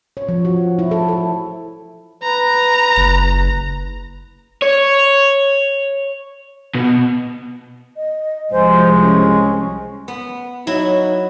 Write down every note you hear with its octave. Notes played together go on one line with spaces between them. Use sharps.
C#5
F3
F#4
E4
A4
A4
B4 A#5
F#1
C#5
B2
D#5
C2 F3 G#3 C5
C#4
B3
F#3 D#4 E4